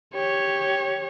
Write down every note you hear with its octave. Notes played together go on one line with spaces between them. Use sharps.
G4 C#5